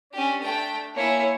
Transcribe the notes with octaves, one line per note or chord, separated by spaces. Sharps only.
C#4 D4 G4
A3 G5
A#3 E4 C#5 G#5